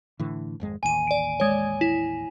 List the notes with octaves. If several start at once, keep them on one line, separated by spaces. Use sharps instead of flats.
A2 D3 E3
G#1 F2 G#3
A1 D#2 G#5 D#7
D5 D7
G#3 C#5
E4